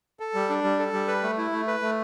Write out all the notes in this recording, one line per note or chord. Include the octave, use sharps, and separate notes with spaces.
A4
G3
D4
G3
A4
G3
B4
A3
E4
A3
B4
A3